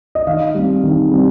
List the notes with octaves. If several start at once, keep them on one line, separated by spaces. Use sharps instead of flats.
D#5
D#3 F5
G3 C4
D#3
G3 C4